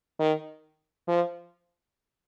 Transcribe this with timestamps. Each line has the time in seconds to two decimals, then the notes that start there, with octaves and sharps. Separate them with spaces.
0.19 D#3
1.07 F3